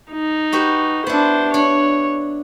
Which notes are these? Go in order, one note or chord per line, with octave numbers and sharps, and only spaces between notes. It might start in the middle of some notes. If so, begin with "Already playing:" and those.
D#4
F#4 G4 B4
B3 D4 E4 C5
D4 C#5